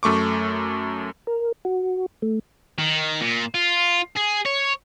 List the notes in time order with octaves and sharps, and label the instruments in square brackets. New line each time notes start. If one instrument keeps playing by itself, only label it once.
[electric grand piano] F#2 A3 C#6 D6
[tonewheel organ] A#4
F#4
A3
[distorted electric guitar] D#3
A#2
F4
G#4
C#5